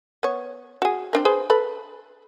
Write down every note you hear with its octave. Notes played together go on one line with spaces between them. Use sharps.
B3 C#5
F#4 G#4
C4 D4 A#4
G#4 B4 C5
A4 B4 B5